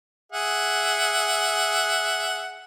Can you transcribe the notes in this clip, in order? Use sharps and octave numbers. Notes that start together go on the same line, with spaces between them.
G#4 E5 F#5